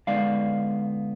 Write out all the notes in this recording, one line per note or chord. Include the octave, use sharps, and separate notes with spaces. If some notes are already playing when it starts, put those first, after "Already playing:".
D3 G#3 B3 D#4 D5 F5